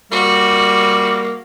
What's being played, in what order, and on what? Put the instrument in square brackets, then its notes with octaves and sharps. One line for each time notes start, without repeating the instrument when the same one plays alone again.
[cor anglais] G3 [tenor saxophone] A#3 [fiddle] F#4